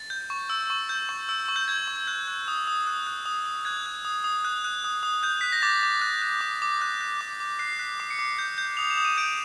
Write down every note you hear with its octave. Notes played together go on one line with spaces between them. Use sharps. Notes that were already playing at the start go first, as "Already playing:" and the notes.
Already playing: A6
G6
C#6
E6
C#6
G6
C#6
E6
C#6
G6
G6 G#6
C#6
F#6 G6
F#6
D#6
D#6
F#6
F#6
D#6
D#6
F#6 G#6
F#6
D#6
D#6
F#6
F#6
D#6
D#6
F#6 G6
F#6 B6
A#6
D6 A6
D6
F#6
F#6
D6
D6
F#6
F#6
D6
D6
F#6 C7
F#6 B6
D6 C7
C#7
D6 C7
G6
G6
D#6 F7
E7
D#6
D#7
G6 D7